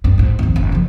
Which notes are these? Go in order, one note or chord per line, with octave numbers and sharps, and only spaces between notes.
G2
A1 G#2
F2 D#3
F#1
F3 F#3